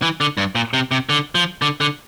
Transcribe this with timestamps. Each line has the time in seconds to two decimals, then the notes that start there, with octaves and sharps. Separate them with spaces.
0.02 E3
0.21 D3
0.38 G2
0.55 A#2
0.74 C3
0.91 C3
1.09 D3
1.35 F3
1.62 D3
1.81 D3